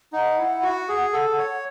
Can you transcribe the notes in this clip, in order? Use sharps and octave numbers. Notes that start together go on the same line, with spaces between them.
D#4 F#5
E4
F#4
G#4
A4
C#5